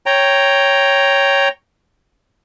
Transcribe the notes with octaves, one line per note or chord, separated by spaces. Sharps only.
C#5 G5 A#5